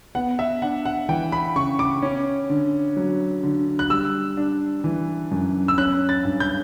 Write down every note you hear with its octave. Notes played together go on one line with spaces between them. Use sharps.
B3 F#5
E5
D4 F#5
F#5
E3 G5
B5
C#3 C#6
D6
C#4
D3
F#3
D3
F#6
G3 E6
D4
E3
F#2
E6
C#4 F#6
A6
G2
G6